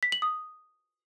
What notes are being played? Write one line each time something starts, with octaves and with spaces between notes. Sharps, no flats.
B6
F#7
D#6